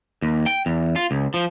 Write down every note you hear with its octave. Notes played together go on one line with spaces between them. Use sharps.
D#2
G5
E2
F4
C#2
F3